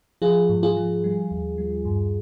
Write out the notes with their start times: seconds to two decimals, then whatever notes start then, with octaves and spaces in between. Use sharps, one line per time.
0.22 F3 F4 G#4
0.49 G#2
0.63 F4 G#4
0.77 F3
1.04 G3
1.31 D#2
1.58 G3
1.85 G2